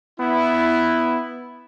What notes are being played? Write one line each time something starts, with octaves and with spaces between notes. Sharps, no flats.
B3 E4